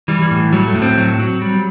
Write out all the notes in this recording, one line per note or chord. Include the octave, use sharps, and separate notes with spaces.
E3 G3
G3
A2
F#3 G3
A3
A2
C4
F#3
F#3
G3